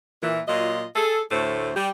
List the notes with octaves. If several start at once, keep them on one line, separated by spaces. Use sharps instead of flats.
A#2 E3
A#2 F#3 F4 D#5
G#4 A4
D2 A2 A3 A4 C5
G3 G4